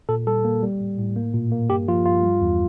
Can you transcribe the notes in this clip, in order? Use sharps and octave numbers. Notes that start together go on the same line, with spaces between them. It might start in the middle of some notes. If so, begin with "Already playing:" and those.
A#2 A4
G3 A4
A#3
G3
A2
A2
A#3
A#2
A#3
G2 G4
F3 F4
G2 F4
G3
E2